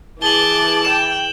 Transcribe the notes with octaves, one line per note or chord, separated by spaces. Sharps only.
E3 G#4 A5 D6 F#7 G7
G5 E7